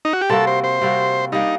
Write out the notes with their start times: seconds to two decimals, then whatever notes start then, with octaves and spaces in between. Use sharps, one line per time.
0.05 D#4
0.13 F#4
0.21 G4
0.30 C3 G3 A#3 F#4 A4
0.47 C5
0.64 C5
0.82 C3 G3 A#3 F#4
1.32 G3 A#3 D4 D#4